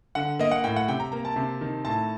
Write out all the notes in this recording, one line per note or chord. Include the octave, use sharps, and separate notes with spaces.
D3 F#5
A#3 D#5
F#5
A2 G5
F#5
C3 G5
A#5
A#3 A#5
A5
C3
D#3
A2 A5